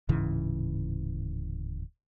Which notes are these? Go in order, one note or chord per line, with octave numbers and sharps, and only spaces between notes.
D1 G#2 C#3 E3